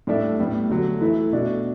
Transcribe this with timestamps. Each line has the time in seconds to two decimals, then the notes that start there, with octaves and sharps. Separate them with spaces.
0.07 A2 G3 D4 A4 E5
0.39 A2 G3 B3
0.70 D3 F#3 A3
1.01 E3 A3 E4 A4 E5
1.32 B2 A3 D4 F#4